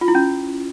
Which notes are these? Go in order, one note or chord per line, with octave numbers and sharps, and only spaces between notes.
F4
E4
C#4